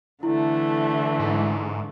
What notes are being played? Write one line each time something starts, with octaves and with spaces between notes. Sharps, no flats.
D3 E3 A3 E4
G#2